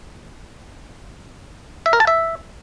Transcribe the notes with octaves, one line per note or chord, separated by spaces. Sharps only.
E5
A#4
A5
E5